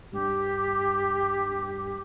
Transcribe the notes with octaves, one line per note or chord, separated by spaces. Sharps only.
G2 G4